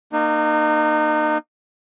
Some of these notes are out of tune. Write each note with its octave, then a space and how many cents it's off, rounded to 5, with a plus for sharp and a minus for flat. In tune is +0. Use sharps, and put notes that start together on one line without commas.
A#3 -5 D#4 -30